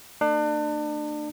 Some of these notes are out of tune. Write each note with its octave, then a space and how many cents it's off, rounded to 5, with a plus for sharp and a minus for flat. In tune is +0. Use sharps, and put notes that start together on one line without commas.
A3 +45 D4 +35